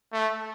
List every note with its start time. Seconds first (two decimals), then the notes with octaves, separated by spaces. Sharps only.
0.13 A3